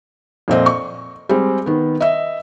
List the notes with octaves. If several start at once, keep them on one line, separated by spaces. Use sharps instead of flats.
F2 A#2 C4 D#5
C#6
G3 G#3 C4
D#3 B3
D#5 E5